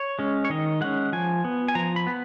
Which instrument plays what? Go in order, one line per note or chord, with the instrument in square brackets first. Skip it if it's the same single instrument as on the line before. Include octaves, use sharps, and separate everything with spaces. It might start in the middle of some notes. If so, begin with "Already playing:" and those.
Already playing: [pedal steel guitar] C#5
G#3 C#4
C#5
D#3 D#5
G#3 C#4 F#5
F3 G#5
B3
G#5
F3 A#5
B5
B3